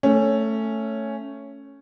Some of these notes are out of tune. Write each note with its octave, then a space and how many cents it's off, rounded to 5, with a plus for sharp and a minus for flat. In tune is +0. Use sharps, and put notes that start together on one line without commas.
A3 +10 C#4 +0